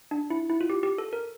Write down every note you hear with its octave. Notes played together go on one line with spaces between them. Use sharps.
D4
E4
E4
F4
G4
G4
A4
A#4